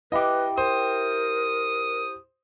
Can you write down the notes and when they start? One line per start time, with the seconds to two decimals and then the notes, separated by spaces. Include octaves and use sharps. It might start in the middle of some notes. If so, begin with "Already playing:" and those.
0.12 E4 G4 B4 D#5
0.58 A#4 C5 D#6